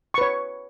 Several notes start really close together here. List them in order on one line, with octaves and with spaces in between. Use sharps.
C#6 B4 C#5